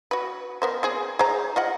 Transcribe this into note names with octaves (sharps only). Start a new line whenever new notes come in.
F#4 B4
B3 A#4 C5
C4 G#4
G#4 C5 A#5
F4 D#5 F#5